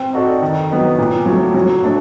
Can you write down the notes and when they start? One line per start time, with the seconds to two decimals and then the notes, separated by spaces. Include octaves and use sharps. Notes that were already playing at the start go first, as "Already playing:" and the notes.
Already playing: C4
0.13 D#4 F#4 A4 D5
0.42 D#3
0.70 F#3 B3 D#4
0.98 A#2
1.26 F#3 A3
1.54 F#3
1.84 A3 D4